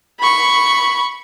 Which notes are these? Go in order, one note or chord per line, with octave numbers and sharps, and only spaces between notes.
B5 C#6